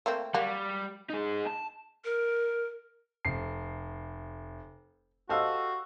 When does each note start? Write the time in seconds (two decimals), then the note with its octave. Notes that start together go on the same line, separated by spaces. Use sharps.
0.06 A3 A#3 C4
0.34 G3 A#3 F#4
1.10 D#4 G#4
1.47 A5
2.05 A#4
3.25 F1 C7
5.29 F#4 G4 A4 C5 D#5 F5 E6